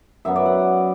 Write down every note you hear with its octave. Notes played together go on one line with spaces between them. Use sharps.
F#2 F#3 B3 E5
D5
F#5